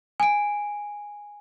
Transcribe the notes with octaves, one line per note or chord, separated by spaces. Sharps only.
G#5 D7